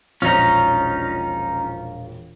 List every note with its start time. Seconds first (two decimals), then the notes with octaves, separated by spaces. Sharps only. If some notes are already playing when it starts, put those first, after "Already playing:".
0.22 E1 A#1 C#4 D#4 F4 C5 D#5 A#5